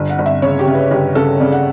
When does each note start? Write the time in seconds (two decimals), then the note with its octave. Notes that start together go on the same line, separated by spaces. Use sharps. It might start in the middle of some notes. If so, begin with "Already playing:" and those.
Already playing: G1
0.10 F#5
0.19 G1
0.26 E5
0.42 C#3 C#5
0.59 G4
0.67 C#3
0.75 B4
0.91 G1 G4
1.15 C#3 A4
1.40 C#3 D5
1.52 F#5